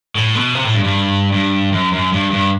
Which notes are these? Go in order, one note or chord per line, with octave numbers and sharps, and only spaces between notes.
A2
B2
C3
A2
G2
G2
G2
F#2
F#2
G2
G2